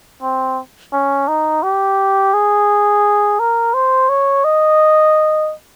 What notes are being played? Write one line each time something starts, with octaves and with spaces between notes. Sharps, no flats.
C4
C#4
D#4
G4
G#4
A#4
C5
C#5
D#5